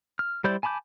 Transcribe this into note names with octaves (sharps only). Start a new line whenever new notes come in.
F6
G3 E4 C5 D5 G6
G#5 A5 B5 D6 G6